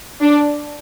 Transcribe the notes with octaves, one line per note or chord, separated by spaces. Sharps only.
D4